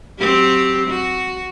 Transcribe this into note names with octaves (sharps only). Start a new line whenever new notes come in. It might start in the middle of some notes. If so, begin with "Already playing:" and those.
F#3 C4 G4
F#4